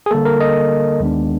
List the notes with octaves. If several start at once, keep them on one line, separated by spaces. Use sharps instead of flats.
G#4
D3 G3 A#3 A4
A#4
D#5
D#2 D#3 G#3 B3 D4